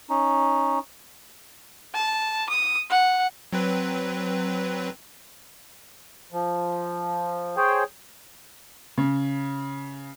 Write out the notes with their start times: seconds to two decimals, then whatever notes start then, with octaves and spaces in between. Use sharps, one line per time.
0.09 C#4 D#4
1.94 A5
2.50 D#6
2.90 F#5
3.53 F#3 C4 B4
6.32 F3
7.57 G#4 C5 C#5 G5
8.98 C#3